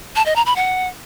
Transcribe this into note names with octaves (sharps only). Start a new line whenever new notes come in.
A5
D#5
A#5
B5
F#5